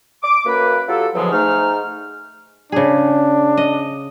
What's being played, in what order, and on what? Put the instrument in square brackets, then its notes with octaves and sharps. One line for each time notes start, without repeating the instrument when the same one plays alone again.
[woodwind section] D6
F#2 A#3 B4
F#3 F4 G4 A4
E2 B2 D3 F3 F#3 G#3
G#2 G#3 A3 D#4 F6
[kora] C#3 G#4 [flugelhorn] D4
[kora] D#5